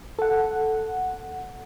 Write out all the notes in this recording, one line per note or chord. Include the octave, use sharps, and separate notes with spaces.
A4 F#5